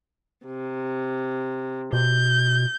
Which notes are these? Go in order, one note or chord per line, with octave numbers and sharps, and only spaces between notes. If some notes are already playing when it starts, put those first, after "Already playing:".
C3
B2 G6